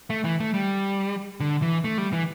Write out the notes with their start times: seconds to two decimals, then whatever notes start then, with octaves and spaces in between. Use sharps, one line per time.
0.10 A3
0.24 E3
0.40 A3
0.54 G3
1.40 D3
1.62 E3
1.84 A3
1.98 G3
2.13 E3